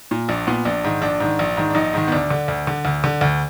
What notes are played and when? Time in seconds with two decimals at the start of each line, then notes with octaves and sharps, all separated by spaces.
0.11 A#2
0.28 A#1 D4
0.47 A#2 B3
0.65 A#1 D4
0.84 G#2 D#3
1.02 A#1 D4
1.20 G#2 D#3
1.39 A#1
1.57 G#2 D#3
1.70 D4
1.75 A#1 D#4
1.94 G#2 D#3
2.08 B3
2.12 D2 D4
2.30 D3
2.48 D2
2.67 D3
2.85 D2
3.04 D3
3.21 D2